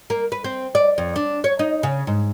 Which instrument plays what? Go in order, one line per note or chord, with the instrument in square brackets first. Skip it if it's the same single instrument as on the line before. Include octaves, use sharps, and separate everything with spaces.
[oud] A#3
B4
C4
D5
F2
D4
C#5
D#4
C#3
G#2